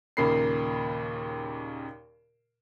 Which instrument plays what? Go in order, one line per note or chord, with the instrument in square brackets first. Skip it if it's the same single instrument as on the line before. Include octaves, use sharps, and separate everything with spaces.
[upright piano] D#2 A#2 C#3 A#3 B5 C7